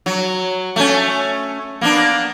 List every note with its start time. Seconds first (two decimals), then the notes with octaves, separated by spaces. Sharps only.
0.06 F#3
0.76 A3 C#4
1.81 A#3 B3 D4